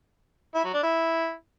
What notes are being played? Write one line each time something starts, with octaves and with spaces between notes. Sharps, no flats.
E4
F#3
D4
E4